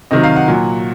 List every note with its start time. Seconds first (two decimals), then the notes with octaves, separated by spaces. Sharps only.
0.11 C3 D#3 F#3 D#5
0.23 F5
0.36 F#5
0.48 A#2 F#3